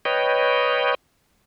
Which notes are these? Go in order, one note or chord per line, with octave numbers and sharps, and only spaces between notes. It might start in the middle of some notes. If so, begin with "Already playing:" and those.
B4 C#5 D#5 G5